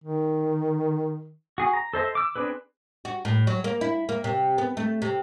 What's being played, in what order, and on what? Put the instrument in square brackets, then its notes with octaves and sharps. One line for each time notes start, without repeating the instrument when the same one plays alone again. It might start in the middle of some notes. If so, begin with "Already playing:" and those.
[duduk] D#3
[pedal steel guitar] F#4 G#4
A#5
A4 C5 D#5 E5
D6 E6
C4 D4 G#4 B4
[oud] F#4
A2
F#3
A#3
E4
A#3
C3
B3
A3
C3